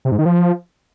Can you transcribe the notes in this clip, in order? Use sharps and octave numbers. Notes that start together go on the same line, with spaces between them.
C3
G#2
D#3
F3